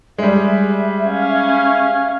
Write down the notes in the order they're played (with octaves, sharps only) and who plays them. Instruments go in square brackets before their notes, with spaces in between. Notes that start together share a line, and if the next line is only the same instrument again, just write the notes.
[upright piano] G3 G#3 [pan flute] E5
[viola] C#4 [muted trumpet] F5